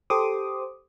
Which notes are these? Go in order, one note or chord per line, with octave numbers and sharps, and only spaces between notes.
G4 A4 C5 C6 D6 D#6